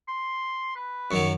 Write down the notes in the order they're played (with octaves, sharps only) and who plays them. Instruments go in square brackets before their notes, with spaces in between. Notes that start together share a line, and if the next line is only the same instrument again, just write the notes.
[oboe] C6
B4
[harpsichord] F#2 D#3 F#3 [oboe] C#6